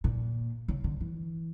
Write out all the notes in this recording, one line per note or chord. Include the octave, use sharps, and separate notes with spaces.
A#2
C#3
D3
E3